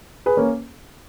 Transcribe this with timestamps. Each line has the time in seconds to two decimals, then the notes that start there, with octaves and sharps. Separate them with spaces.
0.26 G#4 B4
0.37 A#3 C#4